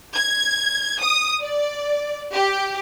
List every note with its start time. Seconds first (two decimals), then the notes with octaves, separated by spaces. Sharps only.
0.16 G#6
1.02 D#6
1.42 D5
2.34 G4